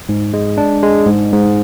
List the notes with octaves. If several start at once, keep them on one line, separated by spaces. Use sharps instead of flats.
G#2
G#3
D4
G#3
G#2
G#2